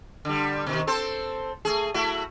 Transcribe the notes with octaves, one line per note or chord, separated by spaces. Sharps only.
D3 G3
B2 D3 D#3
C4 A4 C5
A3 G#4
A3 E4 F#4